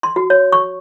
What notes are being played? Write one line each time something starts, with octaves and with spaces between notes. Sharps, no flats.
C6
F#4
C#5
C#6